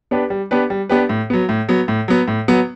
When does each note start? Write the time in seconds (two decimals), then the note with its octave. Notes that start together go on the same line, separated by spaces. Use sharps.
0.11 B3 D4 G4 B4
0.30 G3
0.51 B3 D4 G4 B4
0.70 G3
0.89 B3 D4 G4 B4
1.09 A2
1.30 F#3 B3
1.49 A2
1.69 F#3 B3
1.88 A2
2.08 F#3 B3
2.28 A2
2.48 F#3 B3